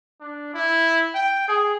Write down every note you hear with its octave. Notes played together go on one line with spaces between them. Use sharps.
D4
E4
G5
G#4